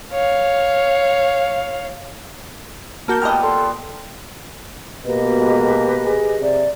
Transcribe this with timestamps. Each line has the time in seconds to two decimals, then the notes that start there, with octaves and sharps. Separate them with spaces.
0.12 C#5 F5
3.08 A#3 F#4 A#4 A5 G6
3.22 A#2 B3 G4 D#5 A5 F6
3.43 A4 C6
5.04 B2 A#3 G4 B4 D#5
5.37 G#3
6.05 G#4
6.40 C3 D5